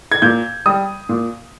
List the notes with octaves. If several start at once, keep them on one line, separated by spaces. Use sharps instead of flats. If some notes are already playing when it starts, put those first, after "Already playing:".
G#6
A#2 G6
G3 D#6
A#2